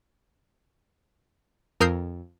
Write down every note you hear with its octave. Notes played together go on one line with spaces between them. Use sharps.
F2 A#4 D#6 E6 G6 C7